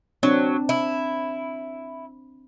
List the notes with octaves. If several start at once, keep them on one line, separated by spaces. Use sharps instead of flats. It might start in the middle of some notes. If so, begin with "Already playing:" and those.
F#3 C4 D4
E4